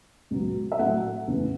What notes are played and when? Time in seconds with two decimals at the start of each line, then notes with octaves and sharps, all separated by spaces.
0.31 C#2 B2 F#3
0.72 E5
0.79 A2 F#3 A3 F#5
1.27 E2 C#3 E3 A3